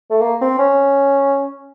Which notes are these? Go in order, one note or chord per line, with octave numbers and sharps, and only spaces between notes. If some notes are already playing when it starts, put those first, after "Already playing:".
A3
A#3
C4
C#4